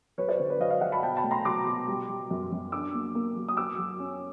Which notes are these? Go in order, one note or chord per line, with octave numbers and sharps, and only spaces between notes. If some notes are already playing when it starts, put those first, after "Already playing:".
F#3 B4 C#5
C5 D5
D3
B4
F#3 D#5 F5
D#5 F5
F#3 E5 F#5
A5 B5
B2 G5 A5
A5 B5
A3
A#5 C6
F#3 C6 D6
B2
G3
G3
F#2
F#2
D4 D6 E6
A#3
A#3
F#3
D#6
F#3 D6 E6
F#3
C#4